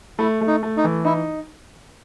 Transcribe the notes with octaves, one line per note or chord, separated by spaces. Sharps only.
A3 E4
A3
D#4
A3
D#4
E3
D#4 E4